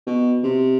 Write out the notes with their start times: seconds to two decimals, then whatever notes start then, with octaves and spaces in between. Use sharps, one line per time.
0.06 B2
0.43 C3